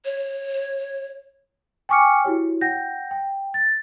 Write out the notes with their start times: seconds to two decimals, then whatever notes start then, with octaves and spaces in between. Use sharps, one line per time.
0.05 C#5
1.89 G5 G#5 C#6 D6 F6 C#7
2.24 E4 F#4 G4 C#5
2.61 F#5 G5 G6 A#6
3.11 G5
3.54 A6